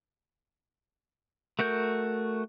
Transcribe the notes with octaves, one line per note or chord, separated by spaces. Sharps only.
A3 F#4 A#4 G6